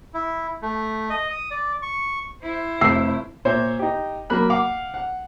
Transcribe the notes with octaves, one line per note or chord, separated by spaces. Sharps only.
E4
A3
D#5
D#6
D5
C#6
E4 C5
F1 E6 C7
A#2 C5 C#5 E5
D#4 G4
F#3 A#3 B5 F#6
F5 F#5 D6
F#5